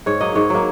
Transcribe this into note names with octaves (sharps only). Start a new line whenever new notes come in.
G#2 C#5
F#3 A#3 D#5
G#2 C#5
F#3 A#3